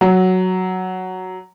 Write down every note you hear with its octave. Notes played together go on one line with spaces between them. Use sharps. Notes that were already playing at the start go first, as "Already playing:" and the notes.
F#3